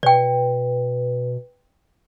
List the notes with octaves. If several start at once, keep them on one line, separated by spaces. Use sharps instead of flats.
B2 B4 D5 G5